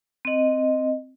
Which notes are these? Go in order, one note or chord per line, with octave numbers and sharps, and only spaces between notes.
C4 D#5